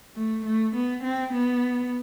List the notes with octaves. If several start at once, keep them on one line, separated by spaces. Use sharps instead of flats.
A3
A3
B3
C4
B3